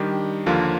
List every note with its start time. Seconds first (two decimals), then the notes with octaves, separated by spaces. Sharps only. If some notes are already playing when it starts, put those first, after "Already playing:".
Already playing: D#3 G3 D4 G4
0.46 D#2 D3 F3 A#3 F4